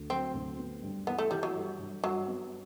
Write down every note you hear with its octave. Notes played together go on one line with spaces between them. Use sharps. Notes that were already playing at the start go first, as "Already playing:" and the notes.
Already playing: D2
F#3 C4
D2
B3
G2
E3 B3
A3
E3 G3
F#3
G2
G2
G2 F#3
B3